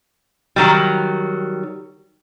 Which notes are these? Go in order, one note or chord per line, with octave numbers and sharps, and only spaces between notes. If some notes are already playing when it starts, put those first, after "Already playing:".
D#3 F#3 G3